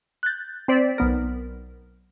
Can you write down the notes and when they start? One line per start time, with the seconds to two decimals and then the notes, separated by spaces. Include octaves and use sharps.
0.23 F#6 G6 A6
0.68 C4 C5 D5 B6
0.98 B1 B3 A#4